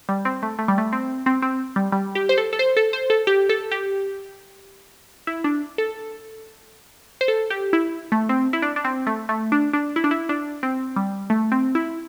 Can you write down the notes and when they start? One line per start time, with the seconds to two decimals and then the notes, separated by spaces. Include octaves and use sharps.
0.09 G3
0.25 C4
0.43 A3
0.59 A3
0.68 G3
0.78 A3
0.93 C4
1.26 C4
1.42 C4
1.76 G3
1.92 G3
2.15 G4
2.29 C5
2.38 A4
2.53 A4
2.59 C5
2.77 A4
2.93 C5
3.10 A4
3.27 G4
3.49 A4
3.71 G4
5.27 E4
5.44 D4
5.78 A4
7.21 C5
7.28 A4
7.50 G4
7.73 E4
8.12 A3
8.29 C4
8.53 E4
8.62 D4
8.76 D4
8.84 C4
9.07 A3
9.29 A3
9.52 D4
9.73 D4
9.96 E4
10.04 D4
10.11 E4
10.29 D4
10.63 C4
10.96 G3
11.30 A3
11.52 C4
11.75 E4